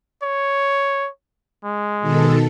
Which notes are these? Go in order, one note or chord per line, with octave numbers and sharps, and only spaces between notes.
C#5
G#3
B2 D#3 A4